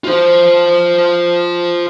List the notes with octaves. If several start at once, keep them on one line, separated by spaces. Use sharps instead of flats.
F4 C5